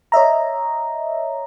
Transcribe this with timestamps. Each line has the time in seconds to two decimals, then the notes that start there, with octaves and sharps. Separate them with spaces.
0.12 C#5 D#5 E5 A#5